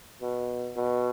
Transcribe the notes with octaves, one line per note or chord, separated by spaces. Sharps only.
B2
B2